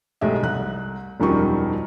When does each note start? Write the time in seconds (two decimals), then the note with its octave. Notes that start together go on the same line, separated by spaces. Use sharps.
0.21 B1 G#3 A3 G4 E5
0.43 C2 F#6
1.20 E1 F#2 D#3 F3 G3 C#6